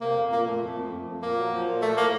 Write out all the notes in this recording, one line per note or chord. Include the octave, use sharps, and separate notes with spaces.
C3 A#3
F2
A#2 A#3
A#2 A3
F2
F2
F2
F2
A#2 A#3
F#3
F3
A#2
F3 A3
A2 A#3